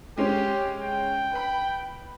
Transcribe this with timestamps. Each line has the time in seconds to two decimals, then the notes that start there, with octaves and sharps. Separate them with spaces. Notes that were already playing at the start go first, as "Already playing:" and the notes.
0.18 G#3 C#4 G4
0.82 G5
1.32 B4 B5